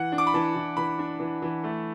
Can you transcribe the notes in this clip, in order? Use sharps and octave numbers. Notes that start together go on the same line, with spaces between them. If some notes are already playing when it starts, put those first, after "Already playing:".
Already playing: E3 F#5
D4
D6
B5
E3 A5
E3
E3 B5
D4
E3
E3
A3